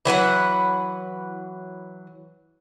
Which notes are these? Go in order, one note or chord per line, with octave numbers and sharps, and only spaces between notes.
E3 F#3 B4 F#5